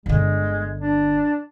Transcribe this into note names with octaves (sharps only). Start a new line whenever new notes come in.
G1 D3 G#3
D4